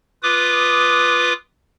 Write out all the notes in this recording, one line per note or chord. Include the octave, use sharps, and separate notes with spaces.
F4 B4 D6 D#6